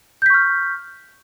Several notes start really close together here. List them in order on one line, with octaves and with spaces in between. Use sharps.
G6 B6 C#6 F6